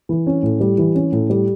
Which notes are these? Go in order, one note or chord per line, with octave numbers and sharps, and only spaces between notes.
E3
C#4
A2
G3
E3
C#4
A2
G3